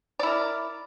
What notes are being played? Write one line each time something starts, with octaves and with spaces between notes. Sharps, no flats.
E4 A#4 D5